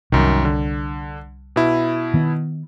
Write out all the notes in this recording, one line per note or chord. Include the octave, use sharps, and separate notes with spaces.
C2 F#2 D#3
D3
B2 E4
D#3 B3